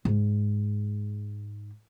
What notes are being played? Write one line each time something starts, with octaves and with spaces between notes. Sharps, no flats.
G#2 G#3